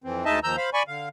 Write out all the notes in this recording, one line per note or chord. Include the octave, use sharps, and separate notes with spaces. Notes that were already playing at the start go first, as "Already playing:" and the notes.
F2 E3 C4
D2 G#3 D#4 D#5 E5 A5
D#2 D#3 F3 A#5 E6 G6
C5 F5 B5
D5 G#5 B5 C#6
D3 F5